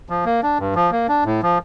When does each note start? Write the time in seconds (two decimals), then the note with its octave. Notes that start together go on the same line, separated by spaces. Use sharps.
0.09 F3
0.25 A#3
0.43 D4
0.59 G2
0.75 F3
0.92 A#3
1.09 D4
1.25 A2
1.43 F3